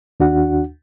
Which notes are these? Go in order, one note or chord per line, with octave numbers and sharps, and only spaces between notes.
D#2 D4 F#4 F#5